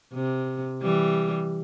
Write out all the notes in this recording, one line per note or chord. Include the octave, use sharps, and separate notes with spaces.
C3
E3 G3